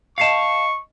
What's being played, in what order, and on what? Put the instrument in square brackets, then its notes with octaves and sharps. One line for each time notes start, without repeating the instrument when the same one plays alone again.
[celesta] D#5 C7 C#7 [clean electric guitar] F5 A5 [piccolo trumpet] C#6